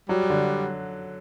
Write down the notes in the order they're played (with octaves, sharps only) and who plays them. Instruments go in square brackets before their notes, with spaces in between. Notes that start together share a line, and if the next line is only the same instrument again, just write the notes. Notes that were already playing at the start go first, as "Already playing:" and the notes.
[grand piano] F#3 [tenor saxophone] G3
[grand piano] D3